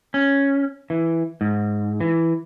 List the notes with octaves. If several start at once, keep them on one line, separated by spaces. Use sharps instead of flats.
C#4
E3
G#2
E3